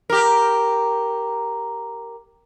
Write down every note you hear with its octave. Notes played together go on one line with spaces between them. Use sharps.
G4 A#4